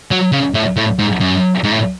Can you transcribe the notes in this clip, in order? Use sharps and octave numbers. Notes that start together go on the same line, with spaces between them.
F#3
C#3
A2
A2
G#2
F#2
G#2
A2